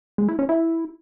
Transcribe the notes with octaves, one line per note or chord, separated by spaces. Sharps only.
G#3
E4
C#4
E4